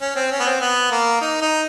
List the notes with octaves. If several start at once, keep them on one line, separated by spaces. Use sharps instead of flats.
C#4
C4
C#4
B3
C4
B3
A#3
D#4
D#4